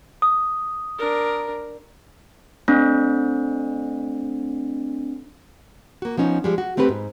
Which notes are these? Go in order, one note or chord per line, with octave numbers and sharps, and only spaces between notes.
D#6
D4 A#4
A3 C4 D4
A#3 F#4
F3 B3 C#4 D#4
F3 G3 G#3
F#4
A3 C4 F#4 G4 B4
G#2